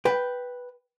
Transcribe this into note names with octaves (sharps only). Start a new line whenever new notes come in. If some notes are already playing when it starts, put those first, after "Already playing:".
B4 G5